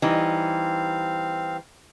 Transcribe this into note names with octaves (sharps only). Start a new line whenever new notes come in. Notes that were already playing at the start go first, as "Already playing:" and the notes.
E3 G3 C4 D#4 F5